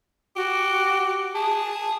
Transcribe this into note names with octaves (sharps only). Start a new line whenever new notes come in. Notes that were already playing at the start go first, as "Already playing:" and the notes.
F#4 G4
G#4 A5